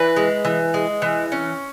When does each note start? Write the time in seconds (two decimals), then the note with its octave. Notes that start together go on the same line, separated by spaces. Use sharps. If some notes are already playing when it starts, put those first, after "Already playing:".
Already playing: E3 B4
0.16 G#3
0.45 E3
0.74 G#3
1.02 E3
1.32 C#4